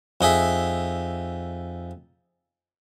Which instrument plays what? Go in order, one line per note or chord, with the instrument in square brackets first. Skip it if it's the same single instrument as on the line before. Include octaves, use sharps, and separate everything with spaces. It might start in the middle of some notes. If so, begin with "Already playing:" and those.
[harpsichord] F2 D#4 G#4 E5